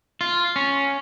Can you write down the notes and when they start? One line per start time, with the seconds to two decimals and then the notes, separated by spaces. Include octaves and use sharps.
0.21 F4
0.56 C#4